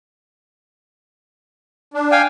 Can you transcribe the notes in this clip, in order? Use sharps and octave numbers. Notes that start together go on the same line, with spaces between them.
D4
F5 G5 G#5